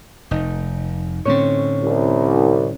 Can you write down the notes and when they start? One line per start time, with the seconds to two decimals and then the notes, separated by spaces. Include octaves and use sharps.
0.31 F1 D#4
1.25 A2 D3 C4 C#4 C#5
1.82 C2